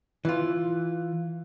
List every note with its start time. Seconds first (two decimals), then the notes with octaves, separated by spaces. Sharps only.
0.25 E3 F4